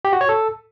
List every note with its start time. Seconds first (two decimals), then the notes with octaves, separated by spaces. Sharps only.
0.05 G4
0.13 F#4
0.21 C#5
0.29 A4